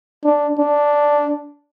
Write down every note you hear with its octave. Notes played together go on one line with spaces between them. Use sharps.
D4
D4